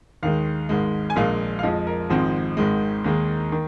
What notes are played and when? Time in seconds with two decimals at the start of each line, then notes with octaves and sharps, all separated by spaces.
0.23 D#2 D#3 G#3 F5
0.69 G#1 G#2 G#3
1.10 G#5
1.16 A#1 A#2 G#3 F5
1.59 F5
1.63 F2 F3 G#3 D#5
1.87 A#4
2.10 G#1 G#2 F3 G#3 C4
2.57 G#1 G#2 D#3 G#3
3.04 D#2 D#3 G#3 A#3
3.52 D#3